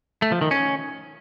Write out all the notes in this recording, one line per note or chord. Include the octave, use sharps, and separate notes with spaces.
A3
F3
D#3
C#4